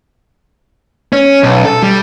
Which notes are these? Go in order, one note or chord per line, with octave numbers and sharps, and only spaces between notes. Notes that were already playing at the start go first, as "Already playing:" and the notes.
C#4
B1
A4
G3